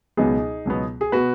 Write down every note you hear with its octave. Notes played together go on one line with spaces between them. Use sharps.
C#2 B2 F#3 B3 D#4 G#4
C#2 B2 F#3 B3
G#4
B2 B3 F#4 B4